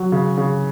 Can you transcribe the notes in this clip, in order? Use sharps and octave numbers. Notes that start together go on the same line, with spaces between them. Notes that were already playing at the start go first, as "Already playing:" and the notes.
Already playing: F#3
C#3
C#3